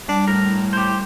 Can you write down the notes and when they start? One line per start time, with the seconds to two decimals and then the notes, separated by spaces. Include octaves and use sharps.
0.08 G3 D4
0.28 A2 A#4
0.73 G4 C5